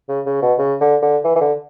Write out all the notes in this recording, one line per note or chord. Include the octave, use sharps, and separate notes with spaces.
C#3
C#3
B2
C#3
D3
D3
E3
E3
D3